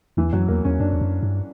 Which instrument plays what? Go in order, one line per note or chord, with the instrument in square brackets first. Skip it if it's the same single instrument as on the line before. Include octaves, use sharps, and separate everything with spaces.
[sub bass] E2 [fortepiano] E3
[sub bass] F#2 [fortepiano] F#3
[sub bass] E2 [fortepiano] A#3
[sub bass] E2 [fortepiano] C#4
[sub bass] F#2 [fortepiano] D4
[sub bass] E2
F#2
G2